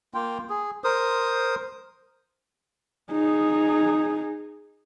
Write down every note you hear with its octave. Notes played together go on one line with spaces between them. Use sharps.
A#3 F4 G5
G#4
A#4 C5 D#6
D#4 G#4